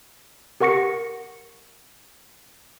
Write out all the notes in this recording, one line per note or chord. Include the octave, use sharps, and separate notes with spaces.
G4 A#4 F#5 C#6 A#6 C#7